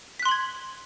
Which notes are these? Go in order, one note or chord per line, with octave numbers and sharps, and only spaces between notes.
C6 F#6 G#6 B6 F#7